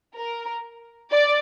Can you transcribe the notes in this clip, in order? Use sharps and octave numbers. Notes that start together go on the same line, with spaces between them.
A#4
D5